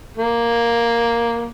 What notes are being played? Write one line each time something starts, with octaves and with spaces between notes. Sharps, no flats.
A#3